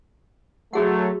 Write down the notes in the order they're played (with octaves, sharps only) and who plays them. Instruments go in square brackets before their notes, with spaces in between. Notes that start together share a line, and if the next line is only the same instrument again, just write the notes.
[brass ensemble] F#3 A3 [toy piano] F#4 G#4 F#5